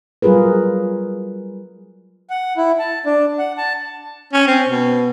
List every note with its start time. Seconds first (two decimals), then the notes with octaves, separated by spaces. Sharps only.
0.22 F#3 G3 F4 G#4 A#4 B4
2.30 F#5
2.57 E4
2.79 A5
3.06 D4
3.39 F#5
3.57 A5
4.33 C#4
4.47 C4
4.69 B2